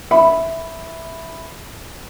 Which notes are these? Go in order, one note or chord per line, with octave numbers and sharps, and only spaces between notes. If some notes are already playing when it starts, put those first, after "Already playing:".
E5 B5